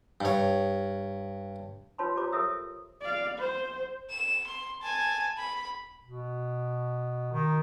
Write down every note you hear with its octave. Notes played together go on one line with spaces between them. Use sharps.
G2 C#5
F4 B4 C#5 A5 B5 C6
F4 G4 C5 C#5 A#5 D6
A4 A#4 C#5 E5 D#6 E6
D5 F5
C5
E7
C6
G#5 A5
B5
B2
D#3